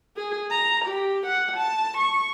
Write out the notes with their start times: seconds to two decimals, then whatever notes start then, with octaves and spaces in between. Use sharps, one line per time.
0.16 G#4
0.50 A#5
0.85 G4
1.26 F#5
1.57 A5
1.97 C#6